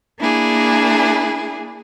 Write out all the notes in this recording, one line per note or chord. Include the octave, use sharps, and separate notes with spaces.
A#3 D4 E4 G#4